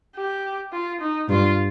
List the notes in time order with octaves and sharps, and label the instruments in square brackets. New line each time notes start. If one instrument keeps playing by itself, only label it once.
[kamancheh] G4
F4
D#4
[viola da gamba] G2 [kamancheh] F4